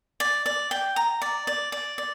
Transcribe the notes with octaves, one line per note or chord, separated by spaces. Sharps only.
D5
D5
G5
A#5
D5
D5
D5
D5